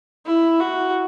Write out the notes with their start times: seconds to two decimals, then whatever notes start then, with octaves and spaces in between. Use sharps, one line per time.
0.25 E4
0.60 F#4